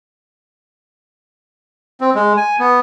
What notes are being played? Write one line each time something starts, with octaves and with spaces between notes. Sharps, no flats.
C4
G#3
G#5
B3